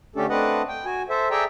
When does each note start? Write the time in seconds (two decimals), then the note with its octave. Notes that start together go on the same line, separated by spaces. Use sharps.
0.16 D3 A3 C#4 D4 G4 A4
0.29 A3 C4 D4 B4 D#5 F#5
0.68 G5
0.85 F#4 G#5
1.10 A4 C5 E5
1.31 G#4 A4 D5 E5 G5 A#5